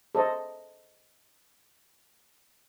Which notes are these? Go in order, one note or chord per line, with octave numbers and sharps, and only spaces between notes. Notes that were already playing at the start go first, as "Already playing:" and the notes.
A4 C5 D#5